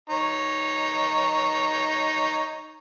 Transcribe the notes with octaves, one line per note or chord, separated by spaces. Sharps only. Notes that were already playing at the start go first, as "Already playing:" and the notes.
D#4 C#5